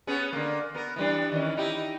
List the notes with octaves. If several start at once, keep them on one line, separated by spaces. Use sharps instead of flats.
B3 C#4 G#4
D3 A#3
B3 A#4
E3 G3 D4
D#3 E3 C#4
D#4 E4 G4